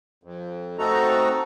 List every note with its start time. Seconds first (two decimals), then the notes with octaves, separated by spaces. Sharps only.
0.23 F2
0.79 A3 C4 D#4 F#4 A4 A#5